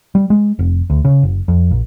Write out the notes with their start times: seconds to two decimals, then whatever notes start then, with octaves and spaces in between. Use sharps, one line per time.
0.15 G3
0.30 G#3
0.59 F1
0.90 D2
1.05 C#3
1.23 F#1
1.48 F2
1.71 A#1